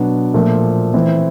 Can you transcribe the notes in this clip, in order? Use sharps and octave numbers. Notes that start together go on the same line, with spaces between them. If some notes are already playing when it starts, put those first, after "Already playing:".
Already playing: B2 F#3 B3 D4
A#2 F3 A3
E3 A3 C4